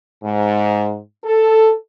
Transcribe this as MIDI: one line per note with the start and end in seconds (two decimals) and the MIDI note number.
0.24 0.97 44
1.24 1.74 69